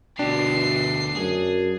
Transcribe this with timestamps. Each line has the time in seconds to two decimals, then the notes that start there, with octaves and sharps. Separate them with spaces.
0.19 D2 B2 D4 G4 C7
1.16 F#2 G#4